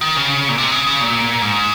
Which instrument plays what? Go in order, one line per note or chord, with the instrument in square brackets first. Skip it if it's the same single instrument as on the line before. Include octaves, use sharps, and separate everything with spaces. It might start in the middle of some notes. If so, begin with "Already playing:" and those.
[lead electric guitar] D#3
C#3
A#2
C3
C#3
C#3
A#2
G#2